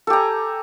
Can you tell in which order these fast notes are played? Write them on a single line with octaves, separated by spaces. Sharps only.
A4 G4 A#5 G#5